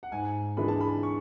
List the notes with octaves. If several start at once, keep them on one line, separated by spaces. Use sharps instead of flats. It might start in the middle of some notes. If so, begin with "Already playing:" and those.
F#5
G#2 G#5
E3 G#3 D4 B5
A5
B5
C#6